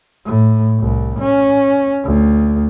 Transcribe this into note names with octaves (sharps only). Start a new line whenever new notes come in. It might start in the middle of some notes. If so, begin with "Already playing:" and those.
A2
C2
C#4
D2